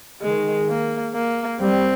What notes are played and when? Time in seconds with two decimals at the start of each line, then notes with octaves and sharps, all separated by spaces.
0.21 D#3 G#3
0.68 A#3
1.14 A#3
1.60 G3 C4